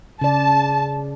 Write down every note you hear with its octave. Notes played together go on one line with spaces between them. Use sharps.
C#3 D5 A5